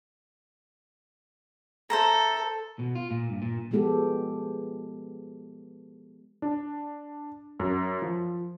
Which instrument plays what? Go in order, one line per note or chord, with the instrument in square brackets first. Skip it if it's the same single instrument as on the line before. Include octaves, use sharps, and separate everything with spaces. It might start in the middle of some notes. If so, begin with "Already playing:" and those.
[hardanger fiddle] A4 [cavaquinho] C5 E5 A#5
[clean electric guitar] B2
F4
A#2
G2
A#2
[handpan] F3 G#3 B3 G4 A4
[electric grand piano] D4
F#2
F3